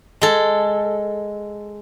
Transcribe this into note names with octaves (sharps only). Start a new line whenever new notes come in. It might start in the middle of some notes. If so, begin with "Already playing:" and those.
G#3 A4